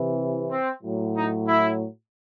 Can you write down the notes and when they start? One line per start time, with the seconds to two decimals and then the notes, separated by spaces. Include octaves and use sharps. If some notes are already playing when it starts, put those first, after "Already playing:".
Already playing: C3 E3
0.50 C4
0.83 A2 F#3
1.15 D#4
1.47 E4